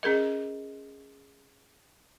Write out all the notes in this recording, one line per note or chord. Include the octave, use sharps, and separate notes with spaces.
C#4 G#4 A#4 D#5